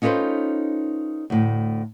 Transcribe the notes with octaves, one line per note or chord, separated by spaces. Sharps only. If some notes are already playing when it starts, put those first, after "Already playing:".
C#4 D#4 F4 A4 B4 C5
D2 A2